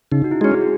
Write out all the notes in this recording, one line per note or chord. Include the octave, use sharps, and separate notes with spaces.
C#3 D#4
F#4
E4
G#3 C#4 F#4
G#4
F#4